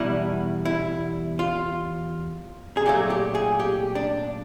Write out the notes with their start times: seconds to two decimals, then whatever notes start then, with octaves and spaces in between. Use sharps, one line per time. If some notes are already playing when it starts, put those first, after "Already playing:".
Already playing: E2 B2 G3 E4
0.65 E4
1.39 F4
2.77 G#4
2.86 A#2 F#3 A3 G4
3.10 G4
3.35 G#4
3.60 G4
3.95 D4